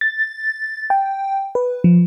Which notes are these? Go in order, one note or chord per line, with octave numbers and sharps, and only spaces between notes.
A6
G5
B4
F3